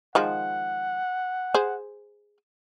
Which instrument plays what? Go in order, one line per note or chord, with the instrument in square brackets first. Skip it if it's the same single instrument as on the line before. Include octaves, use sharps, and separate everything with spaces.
[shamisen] D#3 F3 G#3 [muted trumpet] F#5
[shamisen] G#4 C5